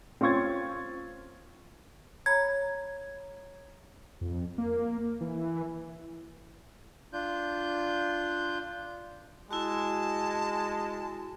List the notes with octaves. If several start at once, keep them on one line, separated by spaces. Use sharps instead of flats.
C4 C#4 F4 C#6 G#6 A6
C#5 A#5 B5 G#6
F2
A#3
E3
D4 F4 G6
G#3 E4 F#4 A5